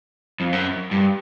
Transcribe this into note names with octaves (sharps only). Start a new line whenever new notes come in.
F2
F#2
G2